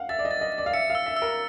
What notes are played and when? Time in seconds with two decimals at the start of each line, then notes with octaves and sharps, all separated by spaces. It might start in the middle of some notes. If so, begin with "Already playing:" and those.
Already playing: F5 F#5
0.09 E5 A6
0.19 D5
0.25 D#5
0.31 A6
0.41 D#5
0.52 A6
0.58 D5
0.66 F5
0.73 E5 C#7
0.90 F5
0.95 E6
1.06 E5
1.17 E6
1.22 A#4